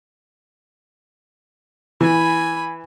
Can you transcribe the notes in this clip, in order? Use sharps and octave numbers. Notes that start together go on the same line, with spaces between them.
E3 G#5 B5